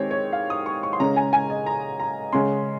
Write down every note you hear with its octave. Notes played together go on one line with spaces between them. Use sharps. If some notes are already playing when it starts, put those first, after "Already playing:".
Already playing: D#3 G#3 C4 G4 C#5
C#5
F5
D#6
C#6
C#6
C6
C#3 G#3 C#4 A#5
G#5
G#5
D#5
A#5
A#5
C#3 G#3 C#4 C6